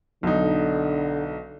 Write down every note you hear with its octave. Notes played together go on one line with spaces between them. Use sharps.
B1 D3 D#4